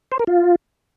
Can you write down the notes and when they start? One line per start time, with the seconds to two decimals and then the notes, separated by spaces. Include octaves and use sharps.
0.12 C5
0.19 A#4
0.27 F4